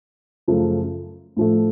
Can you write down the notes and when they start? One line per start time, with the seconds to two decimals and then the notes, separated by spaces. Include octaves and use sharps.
0.48 F#2 C#3 F3 A3
1.37 A2 F3 A3